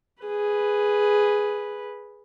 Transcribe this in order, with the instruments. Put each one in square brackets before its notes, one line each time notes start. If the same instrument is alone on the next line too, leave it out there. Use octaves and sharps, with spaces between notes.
[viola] G#4 B4